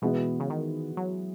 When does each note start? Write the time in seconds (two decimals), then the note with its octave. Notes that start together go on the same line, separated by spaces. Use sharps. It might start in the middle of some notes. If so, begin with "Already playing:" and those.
0.02 B2 E3 G#3 B3 F#4 B4
0.40 C#3
0.50 D#3
0.97 F#3